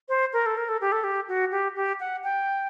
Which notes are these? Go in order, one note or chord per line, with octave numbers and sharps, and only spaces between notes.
C5
A#4
A4
A#4
A4
G4
A4
G4
F#4
G4
G4
F#5
G5